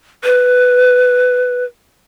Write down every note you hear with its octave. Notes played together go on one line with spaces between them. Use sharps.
B4